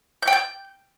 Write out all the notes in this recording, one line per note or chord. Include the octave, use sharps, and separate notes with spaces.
G6
G5
G6